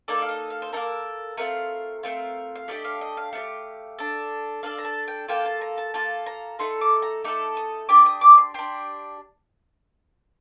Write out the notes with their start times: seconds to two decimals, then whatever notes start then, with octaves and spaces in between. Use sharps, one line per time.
0.08 A#3 D#4 A4 D5
0.22 F5
0.29 D#5
0.50 F5
0.62 C5
0.73 D#4 A4 A#4
0.77 A#3
1.37 A3 C4 F4 A#4
2.03 A3 C4 F4 A#4
2.55 F5
2.68 A3 D4 G4 D#5
2.84 F5
3.01 D#5
3.17 F5
3.33 A3 D4 G4
3.99 D4 A4
4.63 D4 A4 F5
4.78 A#5
4.85 A5
5.08 G5
5.28 A#3 F4 A4 G5
5.46 A5
5.61 A#5
5.78 A5
5.94 A#3 F4 A4 A5
6.26 A#5
6.59 A3 D#4 A4 C6
6.81 D6
7.02 A#5
7.24 A3 D#4 A4 D6
7.57 D#6
7.89 D4 G4 D6
8.06 D#6
8.21 D6
8.38 C6
8.54 D4 G4 C6